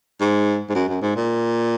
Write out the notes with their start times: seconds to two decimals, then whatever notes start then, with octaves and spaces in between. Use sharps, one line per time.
0.21 G#2
0.69 G#2
0.75 F#2
0.88 F#2
1.02 G#2
1.16 A#2